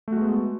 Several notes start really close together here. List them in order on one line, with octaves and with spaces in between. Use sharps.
A3 F#4 G#3 B3